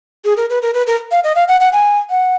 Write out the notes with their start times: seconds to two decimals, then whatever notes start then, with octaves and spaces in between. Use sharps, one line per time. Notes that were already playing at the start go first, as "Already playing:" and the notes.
0.25 G#4
0.37 A#4
0.50 B4
0.62 A#4
0.74 B4
0.87 A#4
1.11 F5
1.24 D#5
1.36 F5
1.48 F#5
1.61 F#5
1.73 G#5
2.10 F#5